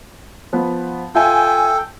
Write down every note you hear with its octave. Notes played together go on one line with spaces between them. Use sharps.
F3 B3
F4 A4 E5 G5 G#5